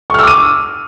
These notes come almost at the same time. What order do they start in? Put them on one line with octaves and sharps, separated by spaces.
C#6 F6 E6 D6 D#7